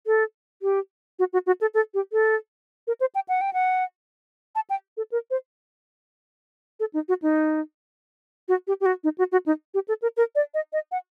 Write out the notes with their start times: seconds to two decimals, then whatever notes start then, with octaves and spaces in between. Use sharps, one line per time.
0.07 A4
0.62 G4
1.19 F#4
1.33 F#4
1.47 F#4
1.61 A4
1.74 A4
1.94 G4
2.13 A4
2.87 A#4
3.00 C5
3.15 G5
3.29 F#5
3.41 G5
3.53 F#5
4.55 A5
4.70 G5
4.97 A4
5.12 A#4
5.31 C5
6.80 A4
6.94 D#4
7.08 F#4
7.22 D#4
8.48 F#4
8.67 G4
8.81 G4
8.86 F#4
9.04 D#4
9.18 F#4
9.32 F#4
9.46 D#4
9.74 G4
9.88 A4
10.02 A#4
10.17 A#4
10.35 D5
10.54 D#5
10.73 D#5
10.92 F#5